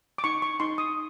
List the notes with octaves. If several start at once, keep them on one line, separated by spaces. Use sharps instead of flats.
D6
D#4 C#6
C#6
D#4 C6
D#6